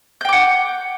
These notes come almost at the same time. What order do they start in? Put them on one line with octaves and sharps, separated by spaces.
G6 G5 D6 F#5